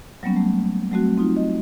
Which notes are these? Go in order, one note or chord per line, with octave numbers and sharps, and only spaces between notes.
F#3 G3 A#3 B3 C#4
A3
F#3 G3 A3 C4 F#4
C4 D#4 F4
D#5